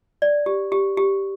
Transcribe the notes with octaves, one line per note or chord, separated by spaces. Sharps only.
D5
G4
G4
G4